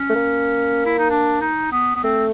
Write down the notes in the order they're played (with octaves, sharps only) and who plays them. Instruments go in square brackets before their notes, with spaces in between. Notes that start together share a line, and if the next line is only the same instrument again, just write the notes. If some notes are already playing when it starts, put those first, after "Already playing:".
Already playing: [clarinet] C#4
[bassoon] A3
A#3
[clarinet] E4
D#4
D4
D#4
B3
B3
[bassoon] A3 [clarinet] C4